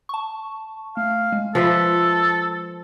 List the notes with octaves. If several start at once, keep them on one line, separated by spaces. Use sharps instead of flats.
A5 C#6
A3 F5
G#3
F3 A4 B4 E5